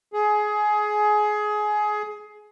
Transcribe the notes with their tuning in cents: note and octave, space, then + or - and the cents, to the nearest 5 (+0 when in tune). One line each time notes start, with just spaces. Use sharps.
G#4 +20